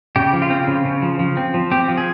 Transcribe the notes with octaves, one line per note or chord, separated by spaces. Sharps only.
C#3 G4
F3
F4
C4
C#3
C#3
F3
F3
C4
F3
C4 G4
F3
G#4